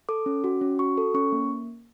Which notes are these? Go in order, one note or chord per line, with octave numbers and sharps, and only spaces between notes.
A4 D6
C#4
F#4
C#4
F#4 C#6
A4
C#4 C#6
A#3